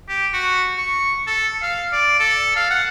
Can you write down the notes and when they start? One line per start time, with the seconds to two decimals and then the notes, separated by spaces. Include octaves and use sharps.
0.08 G4
0.33 F#4
0.78 C#6
1.27 A4
1.62 F5
1.92 D5
2.20 A4
2.56 F5
2.70 F#5